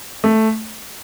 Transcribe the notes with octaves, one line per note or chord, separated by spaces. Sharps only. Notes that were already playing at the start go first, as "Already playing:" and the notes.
A3